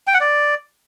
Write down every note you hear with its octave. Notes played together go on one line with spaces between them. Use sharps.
G5
F#5
D5